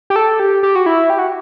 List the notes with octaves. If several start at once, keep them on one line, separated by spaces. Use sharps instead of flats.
G4
A4
G4
G4
F#4
E4
G4
F#4